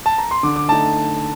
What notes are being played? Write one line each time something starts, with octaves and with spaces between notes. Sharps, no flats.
A5
A#5
C6
D3 D6
D6
A3 D#4 A5